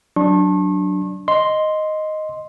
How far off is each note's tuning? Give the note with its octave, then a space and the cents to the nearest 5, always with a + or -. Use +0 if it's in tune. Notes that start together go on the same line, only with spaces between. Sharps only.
F#3 +0 D4 +0 C#6 -40
D#5 +0 C6 +0